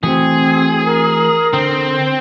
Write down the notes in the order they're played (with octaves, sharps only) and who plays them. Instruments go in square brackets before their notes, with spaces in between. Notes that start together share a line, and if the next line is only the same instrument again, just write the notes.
[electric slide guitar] E3 A3 F#4 [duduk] C4 [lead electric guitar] G#4
[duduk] A#4
[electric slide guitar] D3 [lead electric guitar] C4